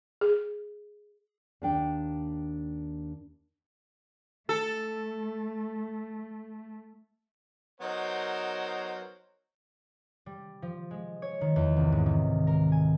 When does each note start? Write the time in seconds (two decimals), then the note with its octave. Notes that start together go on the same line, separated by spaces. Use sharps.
0.21 G#4
1.62 D#2 D4 G5
4.49 A3 A4
7.81 F#3 B3 D#4 A#4 C5
10.26 G3
10.62 F3
10.91 G#3
11.22 C#5
11.41 D#3
11.56 E2
11.77 C2
11.92 G#2
12.06 D#3
12.47 A#4
12.72 G#5